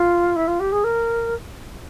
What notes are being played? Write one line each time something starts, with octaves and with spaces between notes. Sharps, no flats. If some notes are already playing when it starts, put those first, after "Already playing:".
Already playing: F4
E4
F4
G4
G#4
A#4